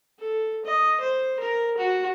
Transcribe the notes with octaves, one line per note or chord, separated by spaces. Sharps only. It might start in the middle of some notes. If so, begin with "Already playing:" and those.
A4
D#5
C5
A#4
F#4